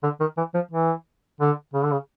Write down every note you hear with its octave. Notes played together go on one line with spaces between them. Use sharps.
D3
D#3
E3
F3
E3
D3
C#3
D3
C#3